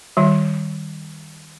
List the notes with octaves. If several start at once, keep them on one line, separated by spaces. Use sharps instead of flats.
D#3 G3